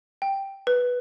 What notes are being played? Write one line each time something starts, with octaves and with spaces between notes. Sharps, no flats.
G5
B4